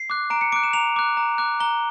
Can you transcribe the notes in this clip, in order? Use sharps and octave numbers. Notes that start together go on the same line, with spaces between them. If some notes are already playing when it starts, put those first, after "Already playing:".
Already playing: C7
D6 F#6
A#5 D7
C#7
D6 F#6 D7
E7
A#5 F7
D6 F#6
A#5
D6 F#6
A#5 G7